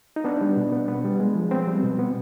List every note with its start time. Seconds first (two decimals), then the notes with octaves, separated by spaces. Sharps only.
0.16 D#4
0.24 B3 D4
0.41 G3
0.57 B2
0.72 B3
0.88 B3
1.04 G3
1.20 G#3
1.35 F3
1.51 B3 C4
1.67 G3
1.83 B2
1.99 B3